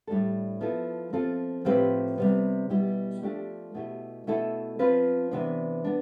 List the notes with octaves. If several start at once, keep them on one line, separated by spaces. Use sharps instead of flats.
A2 G3 D4 A4
F3 B3 E4 A4
F3 C4 F4 A4
A2 F3 C4 G4 B4
C3 G3 B3
B2 G3 B3 E4 G4
F3 A3 D4 G4
B2 A3 E4 G4
B2 A3 E4 A4
F3 C4 F4 B4
C3 E3 B3 D4
B3 D4